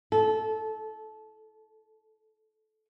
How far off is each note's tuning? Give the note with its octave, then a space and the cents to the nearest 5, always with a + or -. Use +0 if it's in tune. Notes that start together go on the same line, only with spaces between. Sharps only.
A4 -20